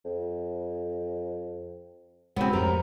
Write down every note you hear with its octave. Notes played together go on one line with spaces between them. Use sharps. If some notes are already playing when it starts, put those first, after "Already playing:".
F2
G#2 C#3 E3 F#3 B3 C4
F2 C3 A3 A#4